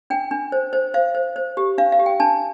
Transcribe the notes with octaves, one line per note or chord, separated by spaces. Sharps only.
D4 G5
D4
C5
C5
C5 F5
C5
C5
G4
D4 F5
F5
G4
G5
D4 A5